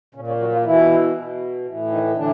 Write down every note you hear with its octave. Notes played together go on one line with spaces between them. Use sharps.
A#2 C#3 C#4
C#3 C#4
F#3 F#4
F3 F4
B2 E3 E4
B2
A2 E3
D#3 D#4
A2 D3 E3 D4